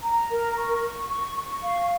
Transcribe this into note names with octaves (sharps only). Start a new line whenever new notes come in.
A#5
A#4
C#6
C#6
C#6
C#6
F5